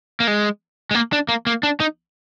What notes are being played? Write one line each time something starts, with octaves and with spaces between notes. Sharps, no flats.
A#3
G#3
G#3
A#3
D4
A#3
A#3
D4
D#4